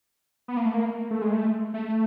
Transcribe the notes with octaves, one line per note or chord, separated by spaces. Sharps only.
B3
A#3
A3
A#3
A3
G#3
A3
A3